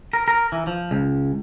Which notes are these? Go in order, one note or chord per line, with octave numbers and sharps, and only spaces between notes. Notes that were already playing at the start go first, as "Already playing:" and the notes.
A#4
A#4
E3
F3
C#2